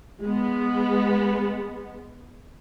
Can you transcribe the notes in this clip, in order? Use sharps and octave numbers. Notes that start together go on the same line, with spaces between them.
G#3 B3